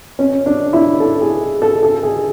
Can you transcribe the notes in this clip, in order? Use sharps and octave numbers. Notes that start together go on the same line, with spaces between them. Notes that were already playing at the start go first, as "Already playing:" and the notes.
C#4
D4
E4
A4
G#4
A4
A4
G#4